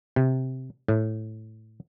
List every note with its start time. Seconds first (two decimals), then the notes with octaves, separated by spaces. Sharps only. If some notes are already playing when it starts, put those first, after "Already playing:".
0.16 C3
0.88 A2